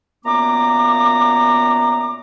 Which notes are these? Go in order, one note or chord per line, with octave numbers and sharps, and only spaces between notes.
F#2 A#2 A#3 B3 A#5 D6